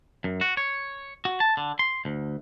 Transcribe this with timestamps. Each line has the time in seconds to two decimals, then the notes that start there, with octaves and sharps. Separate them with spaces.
0.24 F#2
0.41 F#4
0.57 C#5
1.25 F#4
1.40 A5
1.57 D3
1.79 C6
2.05 D2